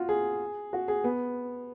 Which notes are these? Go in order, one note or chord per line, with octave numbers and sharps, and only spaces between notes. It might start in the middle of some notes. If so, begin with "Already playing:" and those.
Already playing: F4 F#4
G#4
F#4
G#4
B3